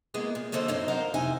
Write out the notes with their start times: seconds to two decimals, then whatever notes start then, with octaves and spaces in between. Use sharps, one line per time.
0.14 G#3 A#3 B3 E4 G#4
0.35 A#2
0.52 D3 F#3 A#3 A4 C5 D#5
0.68 F#2 C#3 F#3 A#3 C4 D#4
0.88 A#4 C5 D#5 F5 F#5 A#5
1.14 F2 C3 D#4 E4 G#5